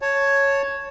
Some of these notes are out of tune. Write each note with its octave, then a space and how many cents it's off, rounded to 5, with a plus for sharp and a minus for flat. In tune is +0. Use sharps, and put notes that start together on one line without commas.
C#5 +0 A5 +0